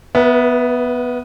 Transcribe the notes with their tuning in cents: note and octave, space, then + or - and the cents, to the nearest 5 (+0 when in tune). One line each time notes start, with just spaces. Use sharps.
B3 +0 B4 -40 E5 +0